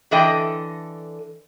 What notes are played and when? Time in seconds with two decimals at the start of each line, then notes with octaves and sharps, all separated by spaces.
0.11 D3 E3 A4 D#5 G5